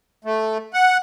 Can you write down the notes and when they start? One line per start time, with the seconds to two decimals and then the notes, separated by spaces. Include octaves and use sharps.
0.25 A3
0.74 F#5